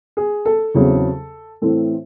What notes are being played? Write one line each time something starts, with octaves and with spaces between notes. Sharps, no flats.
G#4
A4
E2 C#3 F#3 C4
A2 E3 C4 A4